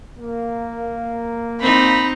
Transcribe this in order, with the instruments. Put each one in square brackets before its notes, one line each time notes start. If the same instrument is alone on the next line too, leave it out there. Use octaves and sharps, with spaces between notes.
[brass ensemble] A#3
[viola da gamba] C4 D#4 [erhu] B5